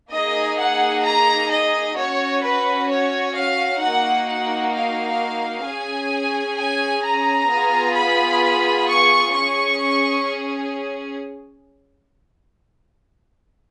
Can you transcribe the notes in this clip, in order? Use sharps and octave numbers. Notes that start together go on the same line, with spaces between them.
A#3 D#4 G#4 D#5
F#5
A#5
D#5
C#4 F#4 C#5
B4
C#5
F5
A#3 D#4 F#4 F#5
F#5
F5
C#4 G#4 G#5
G#5
A#5
B3 F4 G#4
B5
C#6
C#4 G#4 C#6